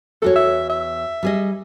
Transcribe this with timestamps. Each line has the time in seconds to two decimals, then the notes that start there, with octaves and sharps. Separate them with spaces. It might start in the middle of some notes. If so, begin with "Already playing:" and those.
0.22 E2 F#4 A4 C#5
0.36 E5
0.69 E5
1.23 G3 G#4 D#5